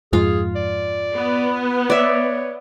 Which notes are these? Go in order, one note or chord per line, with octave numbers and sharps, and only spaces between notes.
F2 G#2 F4 G#4 F5
D5
B3
C#5 D5 E5